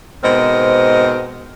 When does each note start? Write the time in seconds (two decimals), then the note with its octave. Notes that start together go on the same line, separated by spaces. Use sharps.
0.24 G#2 B2 C4 A#4 C5 D#5